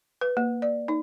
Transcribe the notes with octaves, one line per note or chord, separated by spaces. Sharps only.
B4
A#3
D5
D#4